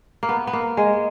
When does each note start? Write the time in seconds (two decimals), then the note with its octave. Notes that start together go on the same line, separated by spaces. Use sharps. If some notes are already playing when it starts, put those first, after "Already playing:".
0.23 A#3
0.29 B3
0.47 B3
0.53 A#3
0.77 G#3